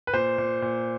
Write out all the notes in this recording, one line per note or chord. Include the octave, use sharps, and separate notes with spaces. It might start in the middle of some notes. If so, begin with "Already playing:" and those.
B4
A#2 C5
A#2
A#2